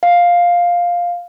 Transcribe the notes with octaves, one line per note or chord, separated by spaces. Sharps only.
F5